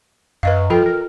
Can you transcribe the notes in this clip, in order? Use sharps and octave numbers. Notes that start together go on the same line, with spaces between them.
F#2 B4 D#5 F5
F3 F4 A4 G5
A#4